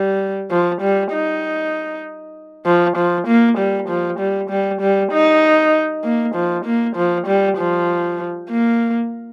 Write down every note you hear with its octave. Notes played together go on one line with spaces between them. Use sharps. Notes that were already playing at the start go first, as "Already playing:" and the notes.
Already playing: G3
F3
G3
D#4
F3
F3
A#3
G3
F3
G3
G3
G3
D#4
A#3
F3
A#3
F3
G3
F3
A#3